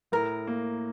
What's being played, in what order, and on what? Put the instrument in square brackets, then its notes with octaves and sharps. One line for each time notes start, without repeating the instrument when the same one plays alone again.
[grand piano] A2 [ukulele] A#4
[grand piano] A#3